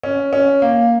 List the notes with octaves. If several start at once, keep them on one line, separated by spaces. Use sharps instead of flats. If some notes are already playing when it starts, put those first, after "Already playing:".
C#4
C#4
A#3